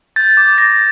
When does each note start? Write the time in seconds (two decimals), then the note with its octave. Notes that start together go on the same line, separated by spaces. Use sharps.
0.16 G6 A6
0.37 D6 A6
0.58 G6 A#6